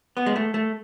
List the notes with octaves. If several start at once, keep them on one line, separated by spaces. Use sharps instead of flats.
B3
G#3
A3
A3